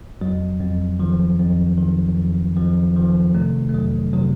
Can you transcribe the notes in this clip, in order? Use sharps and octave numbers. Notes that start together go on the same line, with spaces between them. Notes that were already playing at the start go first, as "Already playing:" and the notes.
F2 F#3
F2
D#3 F3
F2
D#3
F2
F2 F3
D#3 F3
C3 A3
A3
F2 F#3
C3 F#3